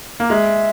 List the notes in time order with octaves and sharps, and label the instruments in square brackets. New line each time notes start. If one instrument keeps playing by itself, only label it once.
[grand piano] A#3
[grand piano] G#3 [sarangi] E5